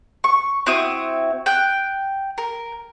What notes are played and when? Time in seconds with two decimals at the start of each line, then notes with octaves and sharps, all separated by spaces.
0.24 C#6
0.66 C4 E4 F#4 D#6
1.46 G5 F#6
2.38 A#4